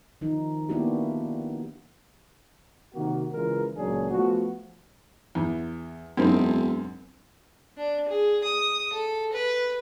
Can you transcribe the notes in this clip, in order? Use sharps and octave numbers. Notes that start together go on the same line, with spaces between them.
D#3 F3 D#4
A#3 B3 D4 E4 F#4 G4
C3 D#3 A#3 F#4
C#3 E3 G#3 F4 A#4
C#2 A#2 F#3 C#4 D4 G#4
F3 A3 B3 F#4
E2
E1 F#2 C4 D#4
D4
G#4
D#6
A4
B4